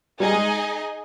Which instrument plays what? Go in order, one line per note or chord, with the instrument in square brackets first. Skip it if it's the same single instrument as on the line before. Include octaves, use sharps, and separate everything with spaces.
[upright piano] G3 [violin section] D#4 G#4 D#5 G#5
[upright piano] G#3